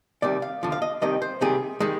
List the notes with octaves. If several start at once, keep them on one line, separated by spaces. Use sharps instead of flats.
C2 C3 D#3 G3 D5
F5
D#2 D3 F3
F5
D#5
C2 C3 D#3 G3 D#5
C5
C2 C3 D#3 G3 G#4
D#3 G3 G#3